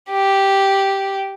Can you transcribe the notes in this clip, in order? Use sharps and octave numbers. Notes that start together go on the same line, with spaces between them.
G4